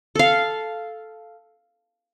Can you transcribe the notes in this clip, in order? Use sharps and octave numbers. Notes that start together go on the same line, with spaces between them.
A4 F5